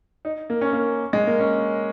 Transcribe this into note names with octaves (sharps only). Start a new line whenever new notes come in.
D#4
A#3
C#4
A#3
G#3
A#3
C#4